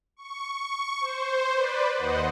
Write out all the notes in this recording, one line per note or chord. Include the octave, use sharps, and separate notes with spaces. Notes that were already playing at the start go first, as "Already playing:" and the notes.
C#6
C#6
C5
B4 D5
D#2 C5 D#5 F#5